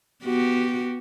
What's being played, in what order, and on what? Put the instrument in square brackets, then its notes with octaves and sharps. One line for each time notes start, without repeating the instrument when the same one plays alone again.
[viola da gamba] B3 F#4 G4